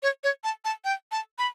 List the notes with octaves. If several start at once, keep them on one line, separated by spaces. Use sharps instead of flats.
C#5
C#5
A5
A5
G5
A5
B5